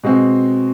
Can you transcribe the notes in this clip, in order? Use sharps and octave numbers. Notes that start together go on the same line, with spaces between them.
B2 G#3 C4